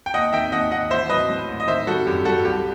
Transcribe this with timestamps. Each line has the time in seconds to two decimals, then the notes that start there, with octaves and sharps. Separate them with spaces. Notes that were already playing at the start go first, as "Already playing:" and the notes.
0.06 G5
0.14 D#2 D#5 F#5
0.33 D#3 E5 G5
0.52 D#2 D#5 F#5
0.71 D#2 D#5 F#5
0.90 A1 C5 E5
1.09 F#3 B4 D#5
1.29 A2
1.48 A1
1.60 D#5
1.67 D#3 C5 E5
1.86 G3 F#4 A4
2.07 F#2 G4
2.25 G3 F#4 A4
2.45 C2 G4